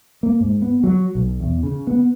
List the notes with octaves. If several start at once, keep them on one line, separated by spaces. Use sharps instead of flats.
A#3
G#2
B3
F#3
B1
E2
C#3
B3